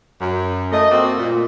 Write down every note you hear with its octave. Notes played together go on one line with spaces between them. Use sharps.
F#2
A3 D#5
A3 A#3 C4 F#4
A#2